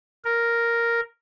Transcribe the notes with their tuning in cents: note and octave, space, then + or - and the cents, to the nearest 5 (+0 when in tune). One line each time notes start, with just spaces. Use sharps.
A#4 +0